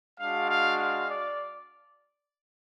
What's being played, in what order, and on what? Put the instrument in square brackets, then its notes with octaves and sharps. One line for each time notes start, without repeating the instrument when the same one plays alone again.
[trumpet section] G#3 D4 F#4 F5
F5
F5
D5